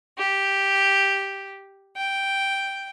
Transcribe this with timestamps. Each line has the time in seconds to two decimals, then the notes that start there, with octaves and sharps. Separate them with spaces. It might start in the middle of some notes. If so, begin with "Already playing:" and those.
0.17 G4
1.95 G5